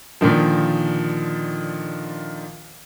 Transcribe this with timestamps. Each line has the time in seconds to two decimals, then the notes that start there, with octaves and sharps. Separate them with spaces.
0.21 A#2 D3 D#3 F3